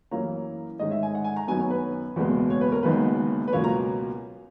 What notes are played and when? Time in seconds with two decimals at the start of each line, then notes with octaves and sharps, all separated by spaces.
0.11 F#2 E3 A#3 C#4 A#5
0.79 G#2 D#3 G#3 C#4 D#5
0.91 E5
1.03 G#5
1.15 F#5
1.24 G#5
1.36 A#5
1.48 F#2 D#3 F#3 B3 G#5
1.60 C#5
1.70 B4
2.16 F#1 E2 B2 G#3 B3
2.50 C#5
2.61 B4
2.72 A#4
2.83 F#1 F#2 D#3 G#3 B3 B4
3.48 B4
3.53 C#2 B2 F#3 A#3 C#4 C#5
3.64 A#5